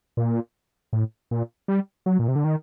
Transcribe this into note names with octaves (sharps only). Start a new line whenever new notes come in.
A#2
A2
A#2
G3
F#3
A#2
C3
D3
D#3